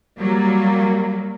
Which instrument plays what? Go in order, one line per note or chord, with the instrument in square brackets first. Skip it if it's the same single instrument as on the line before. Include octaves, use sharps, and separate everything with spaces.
[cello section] F#3 G3 A#3